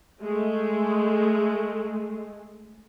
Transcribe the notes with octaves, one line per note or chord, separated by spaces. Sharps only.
G#3 A3